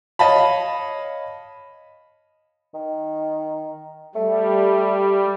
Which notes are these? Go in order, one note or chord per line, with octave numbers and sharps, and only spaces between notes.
C#5 D#5 F5 A5 B5
D#3
G3 A3